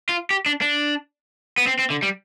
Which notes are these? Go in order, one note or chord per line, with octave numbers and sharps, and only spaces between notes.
F4
G4
D4
D4
B3
C4
C4
D3
G3